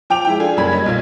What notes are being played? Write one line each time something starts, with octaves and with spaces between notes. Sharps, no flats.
F3 G5 D6 F7
G#3 E4 G5
D4 F4 G#4 A4
F#1 F#2 G3 B5 G#6
G3 C#5 D#5
B1 F4 G#6